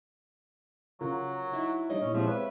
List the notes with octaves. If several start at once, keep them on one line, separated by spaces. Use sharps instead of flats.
C#3 F#3 F4 A#4
D#4 E4
G3 D4 D#4 C#5 D#5
A#2 C#4 E4
F3 G#3 C4 G4 E5
B4 C#5 F5